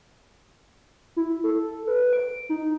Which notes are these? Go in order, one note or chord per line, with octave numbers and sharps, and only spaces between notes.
E4
A4
B4
D7
D#4